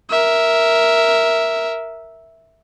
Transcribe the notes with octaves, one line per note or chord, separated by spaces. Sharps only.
A#4 E5